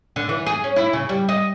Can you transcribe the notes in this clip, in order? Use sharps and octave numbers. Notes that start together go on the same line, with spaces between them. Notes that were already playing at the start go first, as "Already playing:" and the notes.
D3
E3
G#4
C#4
E4
C#3
G3
D#5